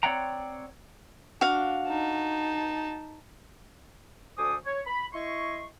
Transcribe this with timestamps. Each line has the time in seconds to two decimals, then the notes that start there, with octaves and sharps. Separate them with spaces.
0.03 C4 C#5 D5 F#5 G5 A#5
1.41 D4 F#4 F5
1.88 D#4 A5
4.37 D2 A4 C5 G#5 D6 D#6
4.65 C#5
4.86 B5
5.13 E4 D#5 C6 C#6